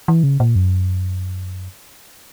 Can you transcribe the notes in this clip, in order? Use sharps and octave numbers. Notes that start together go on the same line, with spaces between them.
E3
C#3
A#2
F#2